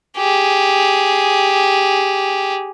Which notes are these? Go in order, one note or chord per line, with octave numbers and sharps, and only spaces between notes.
G4 G#4